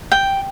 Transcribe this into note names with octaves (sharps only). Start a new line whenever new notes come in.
G5